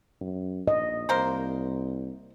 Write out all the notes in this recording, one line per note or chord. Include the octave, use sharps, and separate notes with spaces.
F#2
A#1 D#5
C2 A#3 A#4 C5